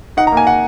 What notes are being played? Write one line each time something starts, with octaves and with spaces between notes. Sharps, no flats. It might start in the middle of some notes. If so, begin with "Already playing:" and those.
D#4 F#5
A#5
A#3 G#5
F#5